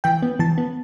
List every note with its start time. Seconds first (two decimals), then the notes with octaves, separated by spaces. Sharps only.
0.04 E3 G5
0.22 B3
0.39 E3 A5
0.58 B3